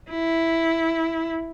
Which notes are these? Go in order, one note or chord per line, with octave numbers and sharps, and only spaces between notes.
E4